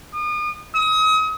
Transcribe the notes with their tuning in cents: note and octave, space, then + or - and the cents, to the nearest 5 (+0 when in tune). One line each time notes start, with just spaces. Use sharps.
D#6 -40
D#6 +35